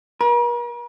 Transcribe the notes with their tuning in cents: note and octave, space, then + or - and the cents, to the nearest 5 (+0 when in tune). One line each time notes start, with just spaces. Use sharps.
A#4 +45